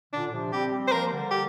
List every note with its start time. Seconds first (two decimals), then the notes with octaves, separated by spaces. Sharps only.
0.13 A#2 D3 D4
0.33 C3 F3
0.53 G3 C4 G4
0.72 G3 C4
0.88 C5
0.92 F3 A#3 A#4
1.12 D3 G3
1.31 G4